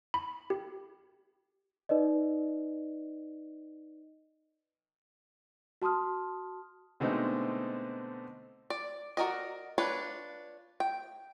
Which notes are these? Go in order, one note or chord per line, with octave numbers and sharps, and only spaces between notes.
B5
G4
D#4 B4 D5 D#5
F#4 A5 C6 D#6 F6
B2 D3 G#3 A3 C4 D#4
D5
F#4 A#4 D5 D#5
D4 F4 B4 C#5
G5